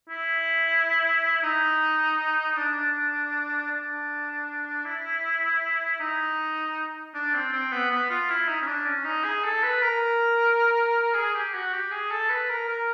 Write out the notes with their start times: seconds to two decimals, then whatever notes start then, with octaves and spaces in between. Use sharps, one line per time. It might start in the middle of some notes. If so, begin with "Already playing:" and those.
0.09 E4
1.43 D#4
2.57 D4
3.71 D4
4.86 E4
6.00 D#4
7.15 D4
7.34 C4
7.52 C4
7.72 B3
7.91 B3
8.10 F4
8.30 E4
8.48 D#4
8.61 C#4
8.67 D4
8.86 C#4
9.05 D#4
9.24 G#4
9.44 A4
9.63 B4
9.82 A#4
11.15 G#4
11.34 G4
11.54 F#4
11.73 G4
11.91 G#4
12.11 A4
12.29 B4
12.49 A#4
12.68 A#4